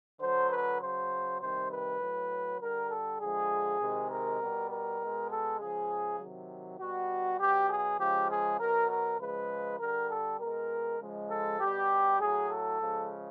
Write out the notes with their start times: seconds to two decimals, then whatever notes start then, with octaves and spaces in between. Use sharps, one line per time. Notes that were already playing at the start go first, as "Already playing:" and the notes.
0.21 D3 F#3 C5
0.50 B4
0.80 C#3 F#3 C5
1.41 C3 D#3 G3 C5
1.71 B4
2.01 A2 F#3
2.60 D3 G3 A#4
2.90 A4
3.20 D3 F3 G#3 G#4
3.80 C3 D#3 G#3
4.10 A#4
4.40 B2 G3
4.71 A#4
5.00 B2 G#3
5.30 A4
5.60 C#3 F3 G#3 G#4
6.20 C3 D#3 F#3
6.80 B2 G3 F#4
7.40 B2 F#3 G4
7.70 G#4
8.00 C#3 F3 G#3 G4
8.30 G#4
8.60 B2 F#3 A#4
8.91 A#4
9.20 C#3 F3 G#3 B4
9.80 D3 G3 A#4
10.10 A4
10.40 B2 G#3 A#4
11.00 C#3 F3 G#3
11.29 A4
11.59 B2 G3 G4
12.19 A2 F#3 G#4
12.50 A4
12.80 C#3 F3 G#3